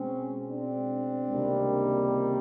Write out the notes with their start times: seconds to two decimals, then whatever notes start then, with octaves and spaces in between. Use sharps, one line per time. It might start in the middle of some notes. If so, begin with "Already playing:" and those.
Already playing: B2 G#3 C4 C#4
0.49 C4 D4
1.30 C#2 C3 D#3 G3 A#3